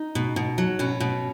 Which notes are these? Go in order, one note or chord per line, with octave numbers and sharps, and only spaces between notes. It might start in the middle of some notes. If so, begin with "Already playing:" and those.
Already playing: D#4
B2
B2
F#3
B2 C#4
B2